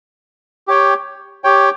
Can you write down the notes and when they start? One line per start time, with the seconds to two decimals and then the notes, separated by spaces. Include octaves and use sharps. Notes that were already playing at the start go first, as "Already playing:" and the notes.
0.68 G4 C#5 G5
1.44 G4 C#5 G5